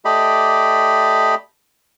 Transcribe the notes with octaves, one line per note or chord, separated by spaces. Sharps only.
A3 G4 D5 D#5 B5